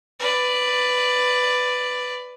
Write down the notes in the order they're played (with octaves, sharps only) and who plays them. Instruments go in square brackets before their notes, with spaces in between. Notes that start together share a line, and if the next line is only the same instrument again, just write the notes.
[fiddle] B4 D5